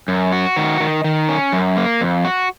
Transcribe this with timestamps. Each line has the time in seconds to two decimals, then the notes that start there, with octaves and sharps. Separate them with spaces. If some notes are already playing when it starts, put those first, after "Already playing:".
0.08 F#2
0.32 F#4
0.56 D#3
0.80 D#3
1.04 D#3
1.29 C#4
1.52 F#2
1.77 A#3
2.01 F2
2.25 F#4